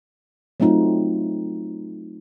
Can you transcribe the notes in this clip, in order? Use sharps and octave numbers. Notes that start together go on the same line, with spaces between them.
F#3 A3 C4 D#4 F4